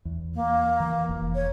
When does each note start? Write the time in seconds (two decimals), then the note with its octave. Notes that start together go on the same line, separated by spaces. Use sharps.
0.05 E2
0.35 A#3
0.80 E3
1.09 F1
1.35 C#5